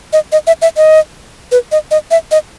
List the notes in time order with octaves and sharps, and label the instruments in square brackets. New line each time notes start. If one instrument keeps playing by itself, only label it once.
[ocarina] D#5
D#5
E5
E5
D#5
B4
D#5
D#5
E5
D#5